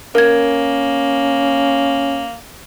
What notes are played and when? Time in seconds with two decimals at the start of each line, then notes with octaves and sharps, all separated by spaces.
0.15 A#3 C#4 A#4 G#6